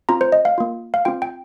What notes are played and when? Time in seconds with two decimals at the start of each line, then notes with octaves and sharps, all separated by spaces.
0.09 C4 F4 A#5
0.21 C5
0.32 D#5
0.45 F5
0.58 A#3 F4
0.94 F5
1.05 C4 F4 G5
1.22 G5